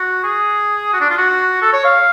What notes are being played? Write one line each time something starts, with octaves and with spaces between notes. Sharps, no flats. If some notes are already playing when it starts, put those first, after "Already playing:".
Already playing: F#4
G#4
F#4
D4
F4
F#4
A4
C#5
F5